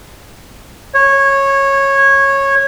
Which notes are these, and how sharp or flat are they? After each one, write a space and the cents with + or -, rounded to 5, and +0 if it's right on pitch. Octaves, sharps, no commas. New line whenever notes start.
C#5 -15